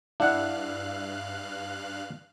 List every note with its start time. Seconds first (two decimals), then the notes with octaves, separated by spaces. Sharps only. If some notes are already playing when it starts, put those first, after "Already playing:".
0.20 G2 D4 E4 F5 F#5 F#6